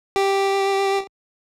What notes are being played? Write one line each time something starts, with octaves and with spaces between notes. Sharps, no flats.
G4